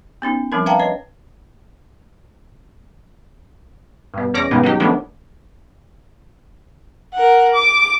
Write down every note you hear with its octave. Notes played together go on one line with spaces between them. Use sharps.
B3 C#4 D#4
F3 G3 C4 D4 A#4
B4 E5 F5 G5 A5 A#5
B4 C#5 D#5
G2 B2
E2 C#4 D5 D6 A#6
G2 B2 D#3 G#3 B3 D#4
F#3 D#4 G4
D#3 F3 A3 B3 C#4 D4
A#4 F#5
D6